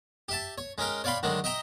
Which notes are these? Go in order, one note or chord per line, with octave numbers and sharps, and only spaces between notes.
G4 E5 A5
C#5
G#3 C#4 A#4 G5
C#5 D5 F5 G5 B5 C6
D3 D#3 F#3 G#3
D#5 E5 G5 A#5